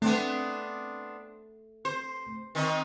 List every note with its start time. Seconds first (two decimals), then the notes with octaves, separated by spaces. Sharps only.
0.02 A3 B3 C4 D4
1.85 C5
2.55 D#3 C4 D#4